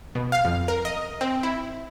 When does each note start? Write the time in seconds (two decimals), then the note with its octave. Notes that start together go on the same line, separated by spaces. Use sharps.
0.15 B2
0.32 F5
0.45 F2
0.68 A#4
0.85 D#5
1.21 C4
1.43 E4